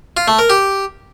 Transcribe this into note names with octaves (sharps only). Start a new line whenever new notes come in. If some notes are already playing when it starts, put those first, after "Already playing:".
F4
A3
A#4
G4